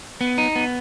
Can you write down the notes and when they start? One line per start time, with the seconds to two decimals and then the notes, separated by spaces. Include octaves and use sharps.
0.21 B3
0.38 D#4
0.56 B3